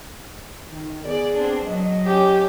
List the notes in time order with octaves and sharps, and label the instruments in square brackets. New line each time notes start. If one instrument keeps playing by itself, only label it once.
[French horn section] D#3
[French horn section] B3 G#4 [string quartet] D5
[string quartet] C4 D4
[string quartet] F#3 [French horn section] D#5
[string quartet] C#4 [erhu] G4